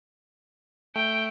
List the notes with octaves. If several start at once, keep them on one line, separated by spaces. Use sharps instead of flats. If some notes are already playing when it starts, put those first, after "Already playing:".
A3 G5